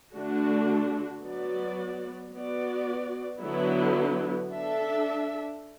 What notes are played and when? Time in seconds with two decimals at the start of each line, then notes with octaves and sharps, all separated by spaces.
0.15 D3 A3 D4 F#4
1.25 F#3 B3 F#4 D5
2.33 B3 F#4 D5
3.41 D3 F#3 B3 E4
4.51 D4 A4 E5